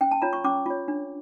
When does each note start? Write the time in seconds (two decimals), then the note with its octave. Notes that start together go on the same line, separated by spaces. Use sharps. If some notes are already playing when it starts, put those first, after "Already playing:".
0.01 C#4 G5
0.11 A5
0.22 F4 C#5 A#5
0.33 C#6
0.44 C#4 D6
0.66 F4 C#5
0.88 D4